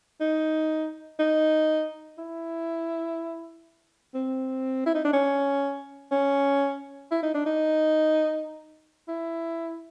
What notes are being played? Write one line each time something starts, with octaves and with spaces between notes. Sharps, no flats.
D#4
D#4
E4
C4
E4
D#4
D4
C#4
C#4
E4
D#4
D4
D#4
E4